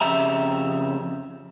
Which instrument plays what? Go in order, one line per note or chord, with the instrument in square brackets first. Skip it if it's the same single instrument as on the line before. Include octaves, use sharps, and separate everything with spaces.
[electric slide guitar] F2 C#3 G4 E5 A#5